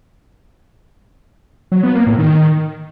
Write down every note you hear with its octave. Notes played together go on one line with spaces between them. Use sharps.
F#3
B3
A#3
A2
D#3